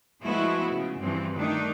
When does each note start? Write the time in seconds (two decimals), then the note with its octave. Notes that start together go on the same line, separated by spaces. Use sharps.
0.22 F3 G#3 A3 B3 E4 F#4
0.72 C#3
1.02 G2 E3 F3 C4
1.37 D#3 A3 D4 D#4